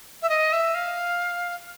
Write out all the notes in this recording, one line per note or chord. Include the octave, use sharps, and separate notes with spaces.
E5
D#5
E5
F5